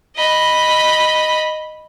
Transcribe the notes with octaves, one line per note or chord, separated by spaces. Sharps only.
D#5 B5